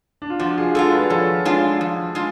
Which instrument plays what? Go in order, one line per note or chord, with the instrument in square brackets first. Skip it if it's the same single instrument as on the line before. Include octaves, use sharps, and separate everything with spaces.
[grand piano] D4
F4
[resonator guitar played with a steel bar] F3 [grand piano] D4 F#4
[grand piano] F4 G#4
[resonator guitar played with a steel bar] G#3 D4 F4 [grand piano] F#4 A4
[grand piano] G#4 B4
[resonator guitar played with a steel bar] F3 [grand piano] A4 C#5
[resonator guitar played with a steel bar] G#3 D4 F4
F3
G#3 D4 F4